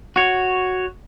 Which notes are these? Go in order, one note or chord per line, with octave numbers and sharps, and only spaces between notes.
F#4 C#5